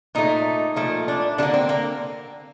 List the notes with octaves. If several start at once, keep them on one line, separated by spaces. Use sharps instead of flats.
A#2 A3 D#4
A#2 F3 A3
D4
D3 G3 A#3 D4
C4
A#3